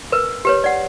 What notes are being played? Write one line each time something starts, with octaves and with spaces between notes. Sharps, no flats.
A#4 B4
G4 B4 C#5
D5 F#5